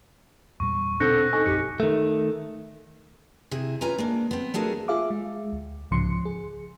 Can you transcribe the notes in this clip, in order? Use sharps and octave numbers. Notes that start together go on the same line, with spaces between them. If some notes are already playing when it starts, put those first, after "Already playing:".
E2 A#2 G3 C#6
B2 D3 C4 A4 F#6 G6 A#6 C#7
D#4 A4 G#5 C#6
E1 A#1 F#2 G4 C#7
D#3 A3
C3 E4 G#4
C#4 F4 B4 G#5 A#5
G#3 A#3 D4
B3 C4
A3 D4 F#4 G#4 A#4
F4 G#4 E5 F5 D6
G#3
D2
C2 G#2 C#3 F3 C6 C#7
G#4